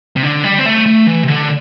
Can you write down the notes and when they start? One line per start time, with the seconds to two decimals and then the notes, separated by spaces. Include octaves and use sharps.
0.16 C3
0.23 D3
0.44 G3
0.59 C4
0.66 A3
0.86 A3
1.07 E3
1.23 C3
1.28 D3